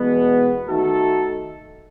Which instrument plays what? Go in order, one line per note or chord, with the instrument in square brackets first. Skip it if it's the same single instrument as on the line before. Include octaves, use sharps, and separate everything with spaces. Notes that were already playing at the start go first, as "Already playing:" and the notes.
Already playing: [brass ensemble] E2 B2 G#3 B3
D#3 A3 D#4 F#4 A4